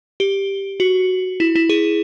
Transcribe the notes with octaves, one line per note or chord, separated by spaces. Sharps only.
G4
F#4
E4
E4
G#4